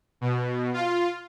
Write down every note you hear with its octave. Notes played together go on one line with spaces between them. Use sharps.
B2
F4